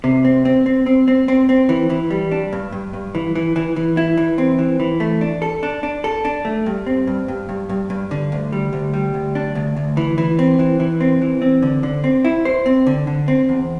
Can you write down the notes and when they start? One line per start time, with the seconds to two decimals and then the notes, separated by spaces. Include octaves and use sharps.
0.04 C3
0.25 C4
0.45 C4
0.66 C4
0.86 C4
1.08 C4
1.28 C4
1.49 C4
1.69 E3
1.90 E3
2.11 G3
2.31 D4
2.53 G2
2.72 G2
2.93 G2
3.15 E3
3.35 E3
3.56 E3
3.76 E3
3.97 E4
4.17 E3
4.38 C4
4.59 E3
4.80 E3
5.00 A3
5.21 D4
5.42 A4
5.63 D4
5.83 D4
6.04 A4
6.25 D4
6.45 A3
6.66 G2
6.86 C4
7.07 G2
7.28 G2
7.49 G2
7.69 G2
7.90 G2
8.11 D3
8.32 D2
8.52 G3
8.73 D2
8.94 G3
9.14 D2
9.35 D4
9.55 D2
9.77 D2
9.97 E3
10.18 E3
10.39 C4
10.59 E3
10.80 E3
11.01 C4
11.21 E3
11.42 C4
11.62 D3
11.83 D3
12.04 C4
12.25 E4
12.45 C5
12.66 C4
12.87 D3
13.07 D3
13.28 C4
13.49 E2